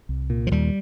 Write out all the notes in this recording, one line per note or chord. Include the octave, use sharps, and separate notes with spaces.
C2
A#2
F3
D#2 G3